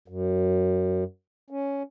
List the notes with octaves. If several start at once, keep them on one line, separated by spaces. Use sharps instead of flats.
F#2
C#4